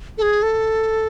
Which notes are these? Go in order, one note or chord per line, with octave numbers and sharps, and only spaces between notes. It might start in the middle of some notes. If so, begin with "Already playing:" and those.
A4
G#4
A4